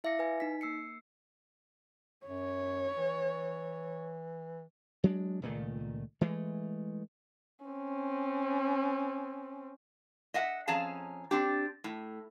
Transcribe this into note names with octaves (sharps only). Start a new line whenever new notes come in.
E4 E5 F5 D6 A#6 C#7
B4 G#5
D#4 B6
A#3 E6 C7 C#7
F#2 C#5
E3
F#3 G#3 D4
C#2 A#2 D#3 A3
E3 G#3 A3
C4 C#4
D#5 E5 F#5
F2 C#4 G#4 F5 A5 A#5
C4 D4 G4
A2